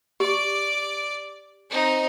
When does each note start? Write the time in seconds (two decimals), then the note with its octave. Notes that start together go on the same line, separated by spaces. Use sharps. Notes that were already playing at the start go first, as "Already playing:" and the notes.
0.20 G4 D5 C#6 D6
1.70 C4 D#4